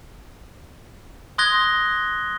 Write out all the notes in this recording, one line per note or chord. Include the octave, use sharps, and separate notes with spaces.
C6 D#6 F#6 G#6 A#6 G7